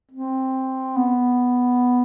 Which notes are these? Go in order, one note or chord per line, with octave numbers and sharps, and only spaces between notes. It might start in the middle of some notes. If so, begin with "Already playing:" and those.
C4
B3